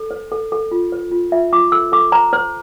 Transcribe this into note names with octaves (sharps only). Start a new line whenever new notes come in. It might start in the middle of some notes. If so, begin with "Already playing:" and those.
Already playing: A4
C5
A4
A4
F4
C5
F4
F4 E5
F4 D6
A4 E6
A4 D6
C5 A#5
C5